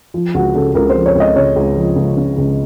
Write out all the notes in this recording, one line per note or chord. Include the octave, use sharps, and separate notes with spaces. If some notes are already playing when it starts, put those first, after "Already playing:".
F3
C#2 F#4
C#3 A4
C#2 A#4
C5
F3
C#5
C#2
D#5
C#3 C#5
C#2
F3
C#2
C#3
C#2